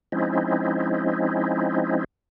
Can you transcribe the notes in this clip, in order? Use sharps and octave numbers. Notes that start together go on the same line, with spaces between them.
F3 G#3 C4 C#4 D#4 E4